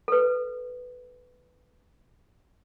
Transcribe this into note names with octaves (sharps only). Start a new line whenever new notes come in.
A4 B4